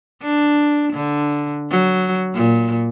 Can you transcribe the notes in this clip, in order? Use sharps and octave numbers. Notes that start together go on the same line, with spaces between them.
D4
D3
F#3
A#2